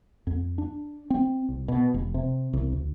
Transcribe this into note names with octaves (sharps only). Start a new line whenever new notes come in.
F2
D4
C4
C2
B2
F1
C3
C2
D2